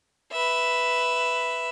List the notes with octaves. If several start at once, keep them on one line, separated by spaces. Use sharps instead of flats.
B4 E5